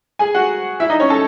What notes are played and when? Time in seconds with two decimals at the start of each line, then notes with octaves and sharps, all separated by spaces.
0.19 G#4 G#5
0.35 F#4 F#5
0.80 E4 E5
0.90 D#4 D#5
1.00 C#4 C#5
1.10 A4 A5